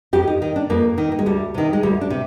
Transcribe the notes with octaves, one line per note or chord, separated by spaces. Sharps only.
F2 G4
D#4
D#3 D#4
D4
F2 A#3
D#3
A#3
G#3
D2 G3
C3 D#3
G#3
D2 G3
D4
C3